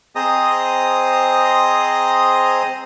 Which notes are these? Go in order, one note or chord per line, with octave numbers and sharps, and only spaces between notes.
C4 G#4 C5 D#5 A#5 D#6